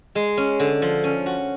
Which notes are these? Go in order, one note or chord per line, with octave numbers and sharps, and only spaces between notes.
G#3
C#4
D3
F3
C#4
F#4